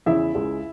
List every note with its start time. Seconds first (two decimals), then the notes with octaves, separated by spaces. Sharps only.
0.06 E2 C#3 E3 E4 E5
0.35 C#2 C#3 G#3